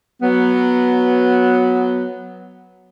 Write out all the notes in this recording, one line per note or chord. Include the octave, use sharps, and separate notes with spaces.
F#3 B3